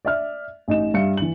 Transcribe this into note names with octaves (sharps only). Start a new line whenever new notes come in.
D5 E5 F6
A1 D#4 E7
G2 E5 F5 C#7
E3 F#7